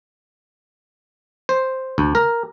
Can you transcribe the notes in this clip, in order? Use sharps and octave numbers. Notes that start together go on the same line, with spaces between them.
C5
D2
A#4